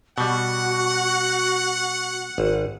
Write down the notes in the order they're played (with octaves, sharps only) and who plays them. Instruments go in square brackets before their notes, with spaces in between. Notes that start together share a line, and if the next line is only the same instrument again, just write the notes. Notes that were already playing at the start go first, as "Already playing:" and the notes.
[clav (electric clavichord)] B2 G3 [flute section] F#4 [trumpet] F#5
[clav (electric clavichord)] G#1